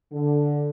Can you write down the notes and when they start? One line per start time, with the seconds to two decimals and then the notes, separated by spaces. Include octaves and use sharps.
0.13 D3